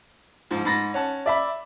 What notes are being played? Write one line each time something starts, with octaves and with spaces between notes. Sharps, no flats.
G#2 F3
G#2 B5 A6 A#6
C#4 F#5 A5
D5 E5 B5